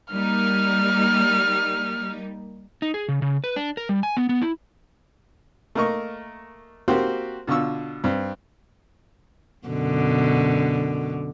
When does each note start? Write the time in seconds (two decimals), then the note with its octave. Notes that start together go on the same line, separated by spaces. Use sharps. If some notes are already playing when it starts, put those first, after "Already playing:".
0.14 G3 A#3 D#4 F6
2.82 D#4
2.94 G#4
3.09 C#3
3.22 C#3
3.44 B4
3.56 D4
3.77 A#4
3.89 G3
4.03 G#5
4.17 B3
4.29 B3
4.42 E4
5.75 A3 A#3 A#4 D#5 C#6
6.88 A#3 C4 F#4 G4 C5
7.47 B2 D3 F4 C#6 E6
8.04 G2 C4
9.67 F#2 B2 D3